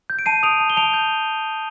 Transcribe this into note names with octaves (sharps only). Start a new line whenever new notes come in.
G6
D7
A5 C7 D#7
D#6 D7 F7
A5
G7
A5 D7 F7
G6